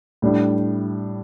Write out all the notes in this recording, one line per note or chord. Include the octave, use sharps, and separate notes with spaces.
A2 G3 D4